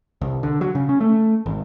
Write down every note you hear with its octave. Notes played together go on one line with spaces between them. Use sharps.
C2
D3
F#3
C#3
C#4
A3
G#1